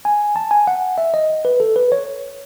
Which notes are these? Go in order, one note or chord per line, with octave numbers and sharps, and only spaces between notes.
G#5
A5
G#5
F#5
E5
D#5
B4
A4
B4
C#5